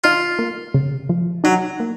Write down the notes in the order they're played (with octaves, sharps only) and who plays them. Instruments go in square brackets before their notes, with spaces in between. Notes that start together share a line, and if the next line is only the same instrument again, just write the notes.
[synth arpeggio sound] D#4 [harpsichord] F4
[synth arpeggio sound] A#3
C#3
F3
[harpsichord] F#3 [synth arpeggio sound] D#4
[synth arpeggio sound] A#3